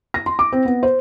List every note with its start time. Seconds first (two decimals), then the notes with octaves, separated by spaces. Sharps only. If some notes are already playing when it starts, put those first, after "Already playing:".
0.14 A#6
0.26 C6
0.39 D6
0.52 C4
0.65 B3
0.83 C5